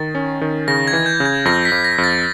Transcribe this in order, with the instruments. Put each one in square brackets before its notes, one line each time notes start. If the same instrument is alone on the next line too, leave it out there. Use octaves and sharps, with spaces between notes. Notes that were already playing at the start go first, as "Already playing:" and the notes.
Already playing: [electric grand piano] D#3 [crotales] A6
[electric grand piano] C#4
D#3
[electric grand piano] C#3 [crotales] A#6
[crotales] G#6
[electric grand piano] E3
[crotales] G6
[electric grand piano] C#3
[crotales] G#6
[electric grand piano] F2 [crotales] A#6
[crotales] B6
[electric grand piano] F2
[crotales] A#6
[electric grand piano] F2
[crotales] A6